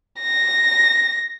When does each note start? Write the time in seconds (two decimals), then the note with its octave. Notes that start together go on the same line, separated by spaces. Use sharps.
0.20 A#6